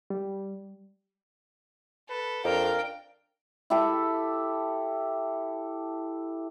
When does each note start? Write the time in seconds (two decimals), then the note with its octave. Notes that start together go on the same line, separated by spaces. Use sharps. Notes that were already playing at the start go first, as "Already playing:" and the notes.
0.10 G3
2.09 A4 B4
2.45 F2 D4 A#4 F5 G5
3.70 E4 G4 A4 E5